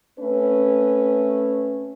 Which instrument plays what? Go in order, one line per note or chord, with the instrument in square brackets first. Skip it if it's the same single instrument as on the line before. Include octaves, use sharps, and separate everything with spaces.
[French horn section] A3 C4 C#4 B4